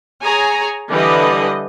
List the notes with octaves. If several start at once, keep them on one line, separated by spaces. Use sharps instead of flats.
G#4 C#5 G#5 A#5
D3 E3 G3 B4 D#5